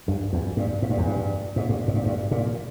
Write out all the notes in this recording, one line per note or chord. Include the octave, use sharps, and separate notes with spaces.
G2
E2
G2
G#2
G2
E2
G2
G#2
G2
G#2
G2
G2
A#2